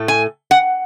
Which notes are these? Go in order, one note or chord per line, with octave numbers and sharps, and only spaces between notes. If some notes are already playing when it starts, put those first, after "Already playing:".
Already playing: A2 A3
G#5
F#5